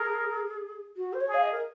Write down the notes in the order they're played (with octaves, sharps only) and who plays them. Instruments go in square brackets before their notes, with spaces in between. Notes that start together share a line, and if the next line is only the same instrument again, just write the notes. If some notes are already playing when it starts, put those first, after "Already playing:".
Already playing: [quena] G#4 [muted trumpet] A#4
[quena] F#4
C5
C#5
[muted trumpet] G#4
[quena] F5
D#5
A#4